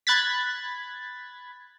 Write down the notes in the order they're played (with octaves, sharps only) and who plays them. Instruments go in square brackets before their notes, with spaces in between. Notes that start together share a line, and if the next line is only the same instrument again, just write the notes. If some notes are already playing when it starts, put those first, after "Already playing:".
[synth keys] B5 F#6 G#6 A6 B6